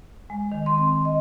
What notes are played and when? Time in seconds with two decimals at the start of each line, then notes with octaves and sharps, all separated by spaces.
0.30 G#3
0.52 D#3
0.66 C6
0.79 C4
1.05 D#5